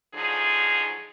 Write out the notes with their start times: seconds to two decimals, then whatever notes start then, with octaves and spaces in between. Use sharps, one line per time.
0.14 D3 F3 F#3 D#4 G#4